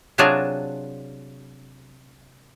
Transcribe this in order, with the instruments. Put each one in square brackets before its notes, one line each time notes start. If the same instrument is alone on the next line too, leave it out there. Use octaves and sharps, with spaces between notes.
[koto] C3 F#3 D4 F4 G#4 A5